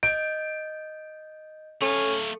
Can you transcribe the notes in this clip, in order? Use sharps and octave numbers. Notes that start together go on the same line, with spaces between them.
D#5 G6 D7
A3 C#4 A4 F5